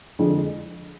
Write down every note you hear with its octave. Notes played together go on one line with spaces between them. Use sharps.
F2 D3 G#3